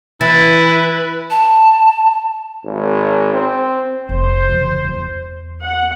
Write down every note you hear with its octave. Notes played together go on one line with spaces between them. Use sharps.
E3 E4 B4 A6
A5
G#1
C4
F1 C5
C#3 E3
E2
F#5